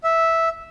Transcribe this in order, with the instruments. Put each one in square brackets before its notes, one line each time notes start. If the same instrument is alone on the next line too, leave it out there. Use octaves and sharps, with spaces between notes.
[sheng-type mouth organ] E5